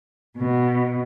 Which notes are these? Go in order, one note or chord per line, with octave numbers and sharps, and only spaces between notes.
B2